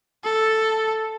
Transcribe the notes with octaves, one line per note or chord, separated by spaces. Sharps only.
A4